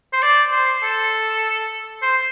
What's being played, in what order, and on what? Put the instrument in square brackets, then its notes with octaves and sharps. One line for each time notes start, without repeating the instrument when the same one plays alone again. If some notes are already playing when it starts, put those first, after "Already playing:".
[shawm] C5
D5
C5
A4
C5